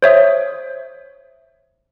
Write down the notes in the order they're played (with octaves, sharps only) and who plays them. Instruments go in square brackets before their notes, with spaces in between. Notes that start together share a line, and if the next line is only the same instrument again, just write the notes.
[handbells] C5 C#5 E5 D#6